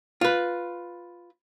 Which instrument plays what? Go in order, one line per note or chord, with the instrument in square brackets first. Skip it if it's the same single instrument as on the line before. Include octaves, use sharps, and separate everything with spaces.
[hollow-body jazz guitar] F4 B4